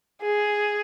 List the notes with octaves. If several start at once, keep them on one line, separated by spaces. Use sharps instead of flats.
G#4